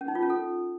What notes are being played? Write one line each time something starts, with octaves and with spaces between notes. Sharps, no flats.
C#4
D#4
F4
C#4
A4